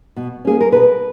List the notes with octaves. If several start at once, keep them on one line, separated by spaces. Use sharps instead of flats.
B2
A#3 C#4 G#4
A#4
B2 B4